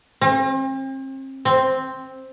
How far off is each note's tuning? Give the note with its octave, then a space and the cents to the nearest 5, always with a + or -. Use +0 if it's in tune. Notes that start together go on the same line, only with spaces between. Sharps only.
C4 +40
C4 +0